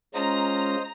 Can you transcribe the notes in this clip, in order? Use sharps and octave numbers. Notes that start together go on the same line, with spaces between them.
G#3 C#4 F4 C5 D#5 A#5